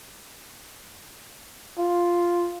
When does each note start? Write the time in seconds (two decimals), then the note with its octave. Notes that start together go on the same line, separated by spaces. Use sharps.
1.78 F4